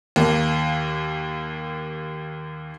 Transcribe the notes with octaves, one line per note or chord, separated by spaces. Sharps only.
D#2 A#3